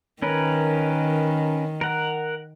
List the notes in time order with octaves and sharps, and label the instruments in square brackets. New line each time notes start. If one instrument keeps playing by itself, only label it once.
[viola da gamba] D#3 [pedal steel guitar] C#4 A#4 B4
[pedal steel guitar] A#4 F#5